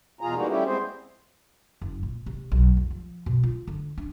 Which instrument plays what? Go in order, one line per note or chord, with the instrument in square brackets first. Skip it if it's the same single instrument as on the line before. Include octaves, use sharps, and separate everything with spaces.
[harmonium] E2 B2 F4 G#4 A#5
E3 G3 G#3 A#3 D#4 F#4
G3 A3 C#4 E4 G4
G#3 B3 C4 G#4 C5
[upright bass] F#1
A#2
C3
B1
F1
F3
B2
F4
D3
D4